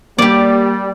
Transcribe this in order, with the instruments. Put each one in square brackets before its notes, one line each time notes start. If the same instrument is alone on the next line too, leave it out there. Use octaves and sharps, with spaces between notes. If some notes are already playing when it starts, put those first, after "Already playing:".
[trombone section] G3 [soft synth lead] A#3 [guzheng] G4 D5